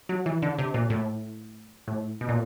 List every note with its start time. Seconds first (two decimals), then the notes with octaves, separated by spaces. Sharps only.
0.09 F#3
0.26 E3
0.42 D3
0.59 C3
0.74 A#2
0.90 A2
1.88 A2
2.21 B2
2.29 A#2